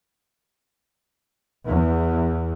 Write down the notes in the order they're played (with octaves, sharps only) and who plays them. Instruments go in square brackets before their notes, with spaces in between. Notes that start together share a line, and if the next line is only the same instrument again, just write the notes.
[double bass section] E2